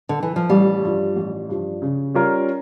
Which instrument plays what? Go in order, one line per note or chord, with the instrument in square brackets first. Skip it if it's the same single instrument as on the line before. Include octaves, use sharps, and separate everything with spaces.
[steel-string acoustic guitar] D3
E3
F3
[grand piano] A1 [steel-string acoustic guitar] G3
[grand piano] G2 F3
A1
G2 F3
C#3
G3 C#4 F4 A#4